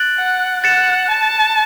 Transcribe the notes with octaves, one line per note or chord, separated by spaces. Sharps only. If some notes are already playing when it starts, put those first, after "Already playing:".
Already playing: F#6 A6 D7 F#7
F#5
F#5 F#6 A6 C#7 E7
A5